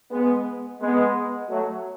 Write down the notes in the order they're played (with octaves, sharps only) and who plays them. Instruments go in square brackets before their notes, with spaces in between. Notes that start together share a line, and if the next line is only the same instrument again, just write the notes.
[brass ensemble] G#3 B3
G#3 B3
F#3 A3